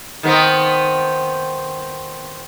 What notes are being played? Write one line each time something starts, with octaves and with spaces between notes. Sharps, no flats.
D#3 B3 C4